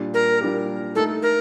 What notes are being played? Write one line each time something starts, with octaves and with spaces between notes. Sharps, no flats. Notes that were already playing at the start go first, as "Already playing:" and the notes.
Already playing: A#2 G3 D4 G4
A#4
A#2 G3 D4 G4
A3 D#4 A4 A#4
A#4